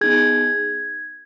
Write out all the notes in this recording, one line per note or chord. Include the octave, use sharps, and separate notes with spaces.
B3 D#4 G#4 G#6